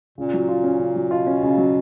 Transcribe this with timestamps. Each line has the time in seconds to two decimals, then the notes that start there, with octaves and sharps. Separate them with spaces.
0.18 A#2 C#3
0.34 F#3
0.49 F4
0.64 C#4
0.79 C#3
0.96 F#3
1.11 B2 F4
1.27 C#4
1.43 C#3
1.58 F#3